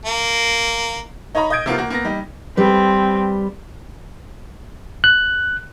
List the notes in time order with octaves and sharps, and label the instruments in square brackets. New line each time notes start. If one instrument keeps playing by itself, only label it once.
[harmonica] A#3
[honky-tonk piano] D#4 C#5 D#5 A#5 B5
D#5 D#6 G6 G#6 D7
C3 A#3 B3 F4
A#3 F#4
A#3 B3 A#6
G3 D#4
[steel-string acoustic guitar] G3 B4 [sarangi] C4
[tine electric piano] F#6